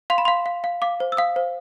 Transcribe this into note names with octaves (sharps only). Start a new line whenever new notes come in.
F5 C6
B5
F5 C6
F5
F5
F5 D6
C5
E6
F5 D#6
C5